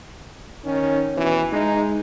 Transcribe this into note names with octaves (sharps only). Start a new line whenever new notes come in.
D#3 C#4
B2 E3
G#3 D#4